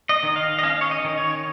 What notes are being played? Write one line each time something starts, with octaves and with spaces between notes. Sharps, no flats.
D#5
D#3
F5
D#5
C#4 F5
C#5
D#5
D#3
C#5